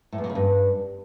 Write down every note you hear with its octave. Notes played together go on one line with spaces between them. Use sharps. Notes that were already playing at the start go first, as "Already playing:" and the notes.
A2
E2
A#2
C#3
G2